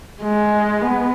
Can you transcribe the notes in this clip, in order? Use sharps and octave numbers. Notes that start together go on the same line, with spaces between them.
G#3
B3